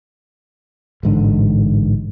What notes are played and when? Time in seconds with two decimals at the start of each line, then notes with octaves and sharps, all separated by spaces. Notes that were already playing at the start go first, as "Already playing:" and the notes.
1.03 A1 G#2 D3